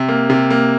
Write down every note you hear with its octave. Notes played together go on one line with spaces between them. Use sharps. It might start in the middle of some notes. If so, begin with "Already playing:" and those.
Already playing: C3
A#3
C3
A#3